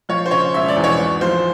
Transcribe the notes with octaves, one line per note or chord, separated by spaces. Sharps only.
F3 C#5
C5
C#3 C#5
E1 E5
D5
E2
C#5
G#1
F3 C5